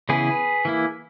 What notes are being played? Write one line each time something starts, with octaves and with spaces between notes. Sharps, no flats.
C#3 E3 B3 E4 G#4 B4
E3 A#3 E4